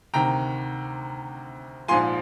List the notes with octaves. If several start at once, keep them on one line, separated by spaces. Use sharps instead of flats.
D2 C3 D#3 G5 A#5
A#1 G#2 F3 G#5 C6